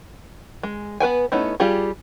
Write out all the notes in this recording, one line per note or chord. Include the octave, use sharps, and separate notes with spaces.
G#3
B3 B4 G5 G#5
A3 B3 C#4 D#4 E4
G3 F4 G4 G#4